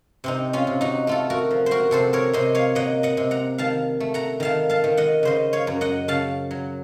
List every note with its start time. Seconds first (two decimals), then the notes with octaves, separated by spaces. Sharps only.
0.24 C3 C4 D#4
0.53 C#4 F4
0.67 C3
0.81 D#4 F#4
1.07 A3 F4 A4
1.30 F#4 A#4
1.50 F3
1.66 C5
1.71 F#4 A#4
1.91 C3 A4 C5
2.13 A#4 C#5
2.33 C3 C5 D#5
2.55 C#5 F5
2.75 A#3 D#5 F#5
3.03 D#5 F#5
3.17 C3
3.31 F#5 A#5
3.58 D#3 F5 A5
4.00 A3
4.14 F#5 A#5
4.40 D#3 F5 A5
4.69 F5 A5
4.84 D#3
4.97 D#5 F#5
5.23 C#3 C5 D#5
5.53 C#5 F5
5.67 F#2
5.81 D#5 F#5
6.08 C#3 F5 A5
6.51 F#3